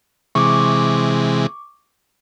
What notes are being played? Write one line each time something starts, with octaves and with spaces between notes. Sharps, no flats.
C3 E3 G#3 C#6 D6